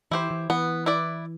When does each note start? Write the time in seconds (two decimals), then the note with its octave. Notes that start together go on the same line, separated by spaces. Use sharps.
0.11 E3 E4 G4 C5
0.31 E3
0.50 E3 B3
0.86 E4 B4 D5